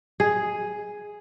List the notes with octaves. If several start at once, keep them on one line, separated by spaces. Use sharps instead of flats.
G#4